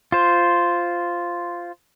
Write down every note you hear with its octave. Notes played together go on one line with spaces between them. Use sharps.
F4 C5